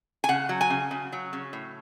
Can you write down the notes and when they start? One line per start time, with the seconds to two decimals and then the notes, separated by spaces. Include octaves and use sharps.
0.24 G#5
0.29 C#3 F#5
0.49 F#3
0.61 G#5
0.70 C#3
0.91 C#3
1.12 F#3
1.33 C#3
1.53 A2